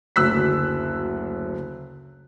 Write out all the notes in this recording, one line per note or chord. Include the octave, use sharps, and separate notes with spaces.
F#1 D2 F#3 E6 F#6 B6